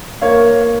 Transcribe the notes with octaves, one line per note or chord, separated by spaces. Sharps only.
A#3 C#5 F5